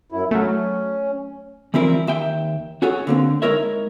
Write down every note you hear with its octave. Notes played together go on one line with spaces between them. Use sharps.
F#2 E4
F#3 A3 C#4
E3 F3 G3 C4 E4 A#4
D#2 E5 G5
C#4 F#4 G#4 A4 C#5
D3 A#3 C4
G#3 D#4 E4 A#4 C#5 E5